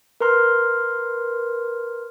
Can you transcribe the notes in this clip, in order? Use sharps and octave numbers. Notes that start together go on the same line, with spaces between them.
A#4 B4 A#5 C6 F6